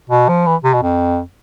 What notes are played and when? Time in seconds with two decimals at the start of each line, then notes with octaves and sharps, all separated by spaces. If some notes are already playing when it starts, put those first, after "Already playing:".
0.10 B2
0.29 F3
0.46 E3
0.64 C3
0.74 B2
0.83 F2